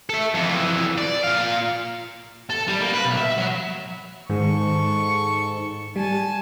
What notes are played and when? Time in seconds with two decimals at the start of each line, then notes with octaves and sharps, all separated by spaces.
0.09 A4 E5
0.34 F2 E3
0.98 D5
1.24 A#2 F5
2.50 A4
2.68 G3
2.81 A#3
2.93 B4
3.05 B1
3.17 E5
3.38 F#3
4.30 G#2 D#3 G#3 A4 C#6
5.00 C#7
5.96 G3 G#5 A5